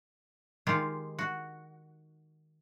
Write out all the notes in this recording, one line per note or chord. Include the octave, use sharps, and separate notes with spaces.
D#3 G#3 F4 G4
F#4